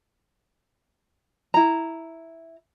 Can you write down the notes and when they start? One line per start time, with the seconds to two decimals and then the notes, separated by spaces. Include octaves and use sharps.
1.54 E4 A#5